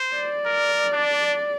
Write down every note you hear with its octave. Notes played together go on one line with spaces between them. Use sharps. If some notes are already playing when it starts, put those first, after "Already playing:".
Already playing: C5
D5
A#4
D4